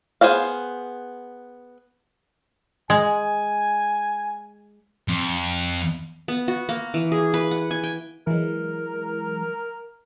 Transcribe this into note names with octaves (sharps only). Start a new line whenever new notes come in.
B3 G#4 C5 D5 F5
G#3 G#5
F2
B3
F#4
A#3
E3
G#4
B4
F#5
G#5
G5
E3 F#3 G#3 A#4